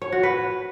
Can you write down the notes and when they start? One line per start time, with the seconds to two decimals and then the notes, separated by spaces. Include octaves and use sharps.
0.02 C#5
0.12 F#4
0.23 B4